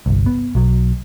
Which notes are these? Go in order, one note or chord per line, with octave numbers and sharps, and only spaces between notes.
G1 C2
B3
B1 F#3